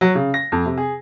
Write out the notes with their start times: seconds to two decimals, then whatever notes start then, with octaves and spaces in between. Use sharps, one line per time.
0.01 F#3
0.15 C#3
0.34 A#6
0.52 F2
0.66 C3
0.77 G#4